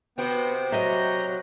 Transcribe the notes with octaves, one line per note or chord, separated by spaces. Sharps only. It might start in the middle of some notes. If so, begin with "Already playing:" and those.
C3 B3 C4 F#4 G5
F#3 D#5 E5 A#5 G6